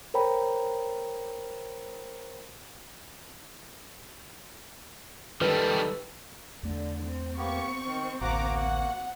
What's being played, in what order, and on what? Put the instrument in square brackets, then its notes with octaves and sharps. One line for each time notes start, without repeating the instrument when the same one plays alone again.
[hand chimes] A#4 C5 C#5 G5 A#5 B5
[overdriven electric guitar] D#3 G3 [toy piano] F4 B4 [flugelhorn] A4
[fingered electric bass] E2 A3 [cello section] D3
[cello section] C4
[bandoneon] A#3 B3 G4 [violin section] C#6
[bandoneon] D#3
[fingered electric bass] A1 D2 [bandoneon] A#3 F#4 [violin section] F#5 A#5 D6
[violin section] F#5